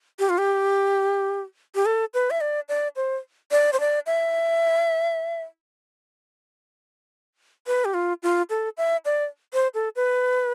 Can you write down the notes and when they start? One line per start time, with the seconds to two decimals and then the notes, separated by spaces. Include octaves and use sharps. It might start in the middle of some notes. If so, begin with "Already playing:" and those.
0.19 G4
0.29 F4
0.38 G4
1.75 G4
1.85 A4
2.14 B4
2.30 E5
2.41 D5
2.69 D5
2.96 C5
3.51 D5
3.73 C5
3.80 D5
4.06 E5
7.67 B4
7.85 G4
7.94 F4
8.23 F4
8.50 A4
8.77 E5
9.05 D5
9.53 C5
9.74 A4
9.96 B4